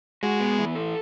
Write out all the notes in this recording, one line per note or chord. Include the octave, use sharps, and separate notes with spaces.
G#3 F#4
B3
E3
A4